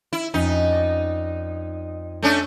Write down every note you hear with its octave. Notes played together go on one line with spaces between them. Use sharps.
E4
F2 C#4 D#4 B6
D5
A3 C#4 D4